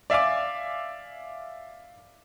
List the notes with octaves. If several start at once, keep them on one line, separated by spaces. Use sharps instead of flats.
D5 E5 F5 G#5 D6